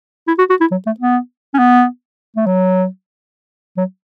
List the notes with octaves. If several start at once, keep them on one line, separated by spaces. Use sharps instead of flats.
E4
F#4
F#4
E4
F#3
A3
B3
C#4
B3
A3
F#3
F#3